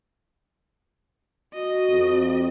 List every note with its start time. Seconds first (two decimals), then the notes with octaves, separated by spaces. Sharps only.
1.54 F#4 D#5
1.89 F2